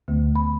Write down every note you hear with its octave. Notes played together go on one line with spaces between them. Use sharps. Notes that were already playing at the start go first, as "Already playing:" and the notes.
D2 D3 A3
B5